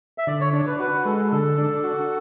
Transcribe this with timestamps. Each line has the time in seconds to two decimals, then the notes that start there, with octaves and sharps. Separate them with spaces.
0.18 E5
0.27 D3 D5
0.41 C#5
0.53 D4 C#5
0.67 B4
0.80 F#4 B4
1.05 G#3 A4
1.32 D3 A4
1.58 D4
1.84 F#4